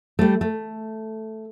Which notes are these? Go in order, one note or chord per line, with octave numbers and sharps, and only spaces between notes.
G3 A3
A3